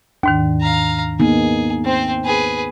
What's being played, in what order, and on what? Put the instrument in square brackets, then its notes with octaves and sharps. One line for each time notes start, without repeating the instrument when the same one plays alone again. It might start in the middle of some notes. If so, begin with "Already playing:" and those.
[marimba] D#2 G#2 D#3 [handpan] D4
[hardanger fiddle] F5 A#5
[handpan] A#3 B3 D#4 [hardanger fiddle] G#4
[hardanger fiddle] C4 C5
G#4 B4